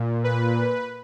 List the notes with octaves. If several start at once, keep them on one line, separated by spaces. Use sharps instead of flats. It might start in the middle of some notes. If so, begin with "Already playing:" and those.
Already playing: A#2
B4